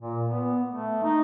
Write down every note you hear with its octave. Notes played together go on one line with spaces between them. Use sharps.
A#2
B3
A3
D#4